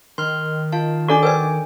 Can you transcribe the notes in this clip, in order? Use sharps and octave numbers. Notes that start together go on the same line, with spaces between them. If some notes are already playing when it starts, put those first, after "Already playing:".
D#3 C6 F6
F4 F5 A5
D4 F#4 A4 D5 C#6 D6
A#4 B4 D5 G5 G#5